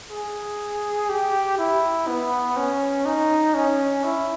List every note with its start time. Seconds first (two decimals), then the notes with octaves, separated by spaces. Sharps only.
0.11 G#4
1.09 G4
1.58 E4
2.08 B3
2.57 C#4
3.06 D#4
3.54 C#4
4.04 E4